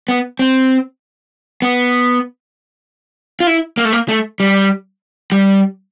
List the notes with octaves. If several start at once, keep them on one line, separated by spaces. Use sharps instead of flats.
B3
C4
B3
F4
E4
A#3
A3
A#3
A3
G3
G3